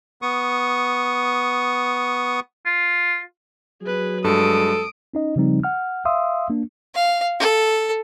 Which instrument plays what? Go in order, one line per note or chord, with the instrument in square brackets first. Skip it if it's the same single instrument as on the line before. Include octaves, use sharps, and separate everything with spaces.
[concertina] B3 C#6 D#6
[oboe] F4
[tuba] F#3 [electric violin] G#4 B4
[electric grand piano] G2 G#3 [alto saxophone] A4 [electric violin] D#6 D7
[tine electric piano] C#4 D#4 D#5
C#3 F3 G3 C4 D#4
F#5 F6
E5 F5 C6 D#6 E6
A#3 D4
[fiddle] F5
A4